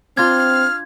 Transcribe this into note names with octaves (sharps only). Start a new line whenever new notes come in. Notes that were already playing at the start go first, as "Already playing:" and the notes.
C4 D4 F4 F6 G#6